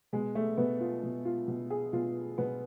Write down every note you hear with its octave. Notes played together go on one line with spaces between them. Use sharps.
B2 G#3
A3
B2 B3
F4
B2
F4
B2
G#4
B2 F4
B2 B3